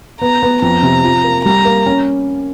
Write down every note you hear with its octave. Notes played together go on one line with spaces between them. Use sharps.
B3 A#5
B3
F2 A#5
C3
F3
A#3
G3 A#5
A#3
C#4